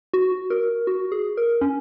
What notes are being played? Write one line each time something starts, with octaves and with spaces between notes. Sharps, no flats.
F#4
A#4
F#4
G#4
A#4
C#4